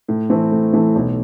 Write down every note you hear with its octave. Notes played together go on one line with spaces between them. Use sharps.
A2
E3 A3 C4
A2
E3 A3 C4
B1